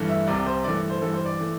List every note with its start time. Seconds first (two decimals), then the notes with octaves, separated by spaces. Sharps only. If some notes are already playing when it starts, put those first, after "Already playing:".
Already playing: G2 E3 A3
0.09 E5
0.27 C2 C3 G3 D5
0.46 C5
0.64 G2 E3 A3 D5
0.90 C5
1.02 G2 E3 G3 A4
1.14 C5
1.25 D5
1.39 E3 A3